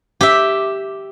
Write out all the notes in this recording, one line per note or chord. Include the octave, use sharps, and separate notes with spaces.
G4 E5